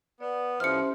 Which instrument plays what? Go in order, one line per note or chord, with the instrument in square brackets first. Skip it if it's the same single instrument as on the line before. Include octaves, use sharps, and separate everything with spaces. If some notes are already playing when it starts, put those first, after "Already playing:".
[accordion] B3 [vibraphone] D5
[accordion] A2 F3 [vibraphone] C#4 G4 E5 [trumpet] C5 [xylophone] F6 C#7